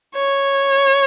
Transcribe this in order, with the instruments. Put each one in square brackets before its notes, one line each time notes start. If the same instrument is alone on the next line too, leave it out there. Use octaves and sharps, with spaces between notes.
[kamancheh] C#5